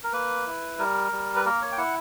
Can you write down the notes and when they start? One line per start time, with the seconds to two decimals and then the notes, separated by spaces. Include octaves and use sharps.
0.04 A#4
0.13 A#3 B4
0.47 E4
0.79 G3 A#4
1.12 G3
1.36 B4
1.45 A#3 A#4
1.62 C#5
1.72 G5
1.77 E4 F#5